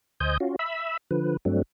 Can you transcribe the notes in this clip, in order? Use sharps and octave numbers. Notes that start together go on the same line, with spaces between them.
D2 C5 D#5 G#5 D#6 G6
C#4 F4 F#4
E5 B5 E6
D3 F3 B4
G2 F#3 A3 C4 D4